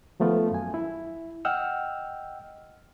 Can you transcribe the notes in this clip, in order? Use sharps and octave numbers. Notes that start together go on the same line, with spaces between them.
D#3 F3 A3 B3 F4
F#2 G#5
E4
D#5 F#5 G5 E6 F6